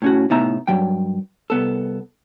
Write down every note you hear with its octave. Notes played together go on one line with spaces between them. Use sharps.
A2 C#4 F#4
A2 C3 B3 D#4 E5 A#5
G2 F#3 G5
C2 B3 A4